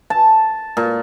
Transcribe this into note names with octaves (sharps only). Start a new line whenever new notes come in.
A5
A#2